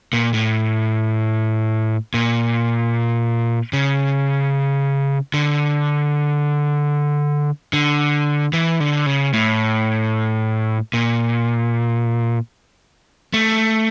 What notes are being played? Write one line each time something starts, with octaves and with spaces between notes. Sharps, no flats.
A#2
A2
A#2
C#3
D3
D3
E3
D3
C#3
A2
A#2
A3